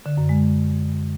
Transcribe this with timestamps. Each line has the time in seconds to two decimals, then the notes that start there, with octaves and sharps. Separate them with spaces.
0.06 D3
0.17 F#2
0.29 G#3
0.41 G#3